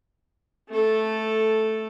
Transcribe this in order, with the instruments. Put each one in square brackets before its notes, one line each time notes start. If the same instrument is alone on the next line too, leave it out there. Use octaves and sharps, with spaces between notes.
[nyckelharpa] A3 A4